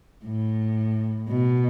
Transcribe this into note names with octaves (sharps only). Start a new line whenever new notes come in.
A2
B2